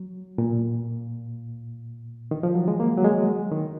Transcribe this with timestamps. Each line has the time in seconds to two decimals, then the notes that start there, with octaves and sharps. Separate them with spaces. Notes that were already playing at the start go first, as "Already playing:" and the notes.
Already playing: F#3
0.38 A#2
2.31 D#3
2.43 F3
2.55 F#3
2.68 G#3
2.80 A#3
2.98 F#3
3.04 G#3
3.51 D#3